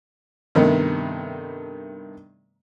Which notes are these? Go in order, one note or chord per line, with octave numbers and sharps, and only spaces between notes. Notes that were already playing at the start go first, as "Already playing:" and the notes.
G2 C3 D#3 A3 B3